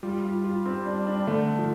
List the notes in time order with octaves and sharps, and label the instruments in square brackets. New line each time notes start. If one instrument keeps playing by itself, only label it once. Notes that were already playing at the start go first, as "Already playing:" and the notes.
[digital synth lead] G3 [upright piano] F4
[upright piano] F4
F4
C4
D4
D4
[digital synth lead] D3 [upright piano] A3
[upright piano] F3